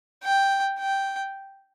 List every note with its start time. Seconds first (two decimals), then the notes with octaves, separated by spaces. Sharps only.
0.23 G5
0.79 G5